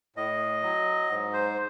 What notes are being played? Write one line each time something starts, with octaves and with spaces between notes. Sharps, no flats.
A2 D#5
F#3
G#2
C5